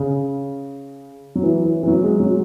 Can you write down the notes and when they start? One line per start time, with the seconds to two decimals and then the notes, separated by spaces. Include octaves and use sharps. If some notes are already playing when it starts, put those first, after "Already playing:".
Already playing: C#3
1.36 F#3
1.43 E3
1.65 E3
1.83 E3
1.87 F#3
2.03 G#3
2.20 F#3